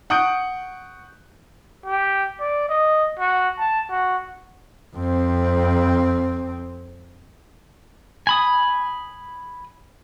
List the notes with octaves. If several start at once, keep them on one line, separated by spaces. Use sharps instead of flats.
F#5 C#6 D#6 F#6 G6 D7
G4
D5
D#5
F#4
A5
F#4
F2 C4
G#5 B5 D#6